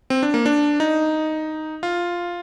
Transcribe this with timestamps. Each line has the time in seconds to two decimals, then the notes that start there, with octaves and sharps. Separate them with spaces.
0.10 C4
0.23 D4
0.34 A#3
0.46 D4
0.80 D#4
1.83 F4